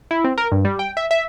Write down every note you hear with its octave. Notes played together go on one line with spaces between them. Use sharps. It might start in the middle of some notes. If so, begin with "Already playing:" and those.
E4
C4
A#4
G2
G3
G5
E5
E5